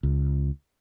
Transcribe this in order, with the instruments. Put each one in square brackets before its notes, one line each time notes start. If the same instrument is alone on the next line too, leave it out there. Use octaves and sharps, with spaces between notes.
[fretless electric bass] C#2